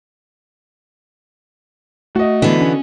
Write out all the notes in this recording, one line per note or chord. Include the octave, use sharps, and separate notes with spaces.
A3 F#4 D#5
D3 E3 B3
C#4